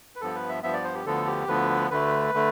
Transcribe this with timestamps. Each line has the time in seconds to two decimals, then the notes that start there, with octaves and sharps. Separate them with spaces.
0.16 B4
0.21 G2 F3 B3 A4
0.35 B4
0.49 E5
0.62 G2 F3 B3 E5
0.73 D5
0.84 C5
0.94 G4
1.06 D2 D3 F3 B3 A4
1.27 G4
1.47 D2 D3 F3 B3 B4
1.90 D2 D3 A3 B4
2.34 D3 A3